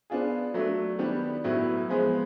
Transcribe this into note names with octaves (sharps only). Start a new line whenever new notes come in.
B3 D4 F4 G#4
F#3 A3 D4
D#3 G3 B3 D4 G4
A2 F#3 B3 E4
F3 G#3 B3